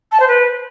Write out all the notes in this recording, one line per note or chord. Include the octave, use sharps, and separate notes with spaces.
A5
C5
B4